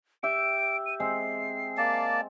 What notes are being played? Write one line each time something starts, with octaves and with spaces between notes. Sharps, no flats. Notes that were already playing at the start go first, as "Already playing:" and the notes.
G4 E5 G5 D7
D#7
G#3 C4 C7
A#3 D5 A5